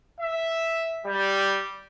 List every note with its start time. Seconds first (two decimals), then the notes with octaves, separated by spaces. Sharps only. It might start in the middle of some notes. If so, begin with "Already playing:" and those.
0.20 E5
1.06 G3